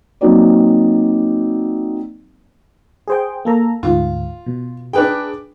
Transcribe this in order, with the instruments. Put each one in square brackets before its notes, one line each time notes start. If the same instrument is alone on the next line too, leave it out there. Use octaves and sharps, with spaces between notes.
[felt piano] F#3 A#3 C4 D#4 F#4 D5
[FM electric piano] G#4 C5 G5
A#3 A4 A#5
[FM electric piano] D2 G#2 [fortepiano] F4
[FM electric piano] B2
[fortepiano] D4 B4 G5 [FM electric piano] G#4 D6